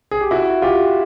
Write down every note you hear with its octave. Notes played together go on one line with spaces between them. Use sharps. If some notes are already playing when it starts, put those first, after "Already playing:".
G#4
G4
E4 F#4
F4 G4